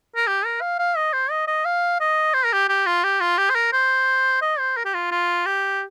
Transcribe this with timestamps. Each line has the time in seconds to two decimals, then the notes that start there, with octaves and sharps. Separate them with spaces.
0.16 A#4
0.27 G4
0.45 A#4
0.61 F5
0.79 F5
0.97 D#5
1.13 C5
1.31 D#5
1.47 D#5
1.65 F5
2.00 D#5
2.34 C5
2.45 A#4
2.52 G4
2.69 G4
2.86 F4
3.04 G4
3.21 F4
3.38 G4
3.50 C5
3.56 A#4
3.73 C5
4.42 D#5
4.59 C5
4.77 A#4
4.85 G4
4.94 F4
5.11 F4
5.46 G4